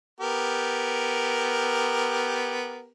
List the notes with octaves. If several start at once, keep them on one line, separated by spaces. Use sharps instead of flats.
B3 G4 A#4